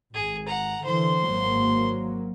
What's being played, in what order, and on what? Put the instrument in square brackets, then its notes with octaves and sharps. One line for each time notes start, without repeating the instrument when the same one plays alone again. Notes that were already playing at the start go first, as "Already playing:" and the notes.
[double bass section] G#1 [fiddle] G#4
[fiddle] F#5 A#5
[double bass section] D3 E3 [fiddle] C5 C6
[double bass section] G#1 F#3 A#3